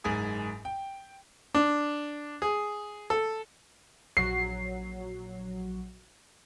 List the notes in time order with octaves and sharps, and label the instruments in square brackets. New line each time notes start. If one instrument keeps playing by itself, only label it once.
[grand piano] F#1 G#2 G#4 G#5 D#6
G5
[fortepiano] D4
G#4
A4
[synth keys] A#1 F#3 [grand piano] C7